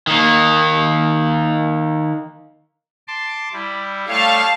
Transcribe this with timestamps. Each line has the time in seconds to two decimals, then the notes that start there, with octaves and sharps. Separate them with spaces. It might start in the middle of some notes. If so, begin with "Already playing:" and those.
0.07 D#3 A#3
3.08 A5 C6 D6
3.53 G3 E4
4.08 G3 A3 C#5 F5 A5